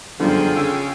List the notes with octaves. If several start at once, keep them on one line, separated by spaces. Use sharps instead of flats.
G1 F#2 D3 F3 F4 G#4 G5
C#3 E6